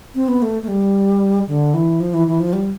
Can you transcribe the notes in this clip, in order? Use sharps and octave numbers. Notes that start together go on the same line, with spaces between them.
C4
B3
A3
A3
G3
D3
E3
F3
E3
E3
F3
G3